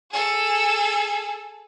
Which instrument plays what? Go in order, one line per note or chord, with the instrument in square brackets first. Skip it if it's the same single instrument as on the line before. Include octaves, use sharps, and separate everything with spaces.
[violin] G#4 A4